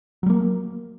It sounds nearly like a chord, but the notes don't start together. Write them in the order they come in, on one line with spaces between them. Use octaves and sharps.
F#3 G3 A#3